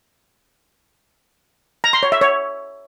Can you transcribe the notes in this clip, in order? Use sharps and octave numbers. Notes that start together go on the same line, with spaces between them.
A#5
C6
C#5
E5
C#5